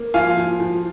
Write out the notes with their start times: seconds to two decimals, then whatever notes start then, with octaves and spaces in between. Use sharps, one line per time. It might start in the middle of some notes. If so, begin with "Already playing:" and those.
Already playing: A#3
0.14 F3 F5 G#5
0.37 F3
0.60 F3